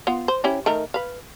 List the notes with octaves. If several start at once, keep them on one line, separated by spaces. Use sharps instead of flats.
B3 F4
C5
C#4 E4 G4
D#3 A3 A#4
B4 F5